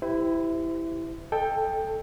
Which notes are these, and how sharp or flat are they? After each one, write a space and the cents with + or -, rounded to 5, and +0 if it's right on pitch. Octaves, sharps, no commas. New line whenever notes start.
E4 +0 G4 +0 C5 -40
A4 +0 D#5 -15 G5 +15